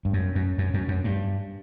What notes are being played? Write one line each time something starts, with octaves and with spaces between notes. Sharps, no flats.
G2
F#2
F#2
F#2
F#2
F#2
G2